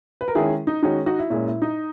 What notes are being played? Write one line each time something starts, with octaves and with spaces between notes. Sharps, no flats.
B4
A#4
D#3 G#3 C#4 E4 G#4
D#4
D#3 G#3 C#4 D#4 F#4
D#4 F#4
E4
A#2 G#3 C#4 E4
E4
D#4